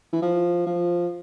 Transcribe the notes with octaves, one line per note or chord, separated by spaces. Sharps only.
E3
F3
F3